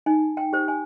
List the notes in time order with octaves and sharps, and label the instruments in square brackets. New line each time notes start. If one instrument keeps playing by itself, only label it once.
[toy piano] D#4 G#5
G5
G4 C5
G#5